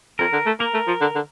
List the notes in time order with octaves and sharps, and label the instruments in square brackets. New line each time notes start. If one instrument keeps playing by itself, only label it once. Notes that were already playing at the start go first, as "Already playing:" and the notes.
[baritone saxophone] F2 [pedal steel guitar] A#4
[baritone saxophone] D3
A3
[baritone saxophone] A#3 [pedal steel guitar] A#4
[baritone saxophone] A3
F3
D3
D3